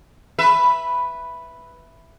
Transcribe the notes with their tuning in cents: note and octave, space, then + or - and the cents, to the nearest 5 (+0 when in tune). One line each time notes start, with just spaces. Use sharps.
B4 +0 E5 +5